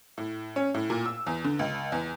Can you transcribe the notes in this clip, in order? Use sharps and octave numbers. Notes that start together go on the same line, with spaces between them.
A2
C#4
A2
A#2
E6
E2
D3
C#2
E2